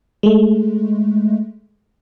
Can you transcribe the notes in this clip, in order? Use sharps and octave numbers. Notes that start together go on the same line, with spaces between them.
G#3 A3